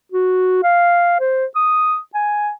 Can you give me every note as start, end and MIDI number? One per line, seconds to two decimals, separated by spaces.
0.12 0.58 66
0.64 1.16 77
1.20 1.45 72
1.56 1.98 87
2.14 2.51 80